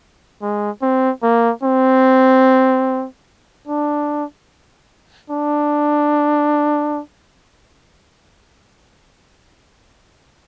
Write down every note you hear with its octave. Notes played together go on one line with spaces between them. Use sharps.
G#3
C4
A#3
C4
D4
D4